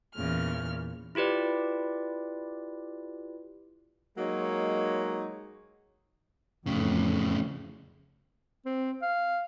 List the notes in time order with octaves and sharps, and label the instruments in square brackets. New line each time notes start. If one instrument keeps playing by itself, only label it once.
[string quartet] E2 A#2 C#3 F6
[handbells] E4 F4 G4 B4 D5
[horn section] F#3 G#3 A#3 D#4 C#5
[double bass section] F2 [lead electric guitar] A2 C#3
[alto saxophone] C4
F5